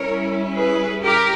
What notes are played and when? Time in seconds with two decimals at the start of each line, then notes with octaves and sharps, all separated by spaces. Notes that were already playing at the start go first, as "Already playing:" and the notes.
Already playing: G3 C#4 E4 A#4 C#5
0.56 G#4 B4
1.03 G4 A#4